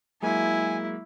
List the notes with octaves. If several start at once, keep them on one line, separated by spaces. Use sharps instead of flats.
F#3 G#3 A#3 E4 G#5